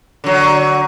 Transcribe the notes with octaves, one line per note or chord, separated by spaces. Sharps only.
D3 F#3